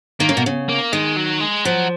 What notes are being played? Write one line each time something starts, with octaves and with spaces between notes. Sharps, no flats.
D#3 A#3
C#3
B2
C#3
A#3
D#3 G#3
F#3
G#3
F3 F#3